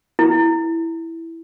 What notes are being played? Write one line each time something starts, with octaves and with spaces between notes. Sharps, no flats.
E4